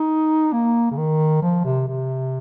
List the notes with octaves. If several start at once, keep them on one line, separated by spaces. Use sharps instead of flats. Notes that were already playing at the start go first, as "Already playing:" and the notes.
Already playing: D#4
A#3
C#3
D#3
F3
C3
C3